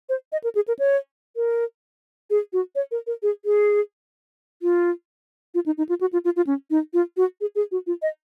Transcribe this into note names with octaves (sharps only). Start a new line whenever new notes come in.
C5
D#5
A#4
G#4
A#4
C#5
A#4
G#4
F#4
C#5
A#4
A#4
G#4
G#4
F4
F4
D#4
D#4
F4
F#4
F4
F4
F4
C#4
D#4
F4
F#4
G#4
G#4
F#4
F4
D#5